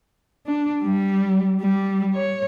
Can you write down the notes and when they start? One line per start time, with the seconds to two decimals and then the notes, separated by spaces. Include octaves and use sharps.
0.47 D4
0.83 G3
1.61 G3
2.15 C#5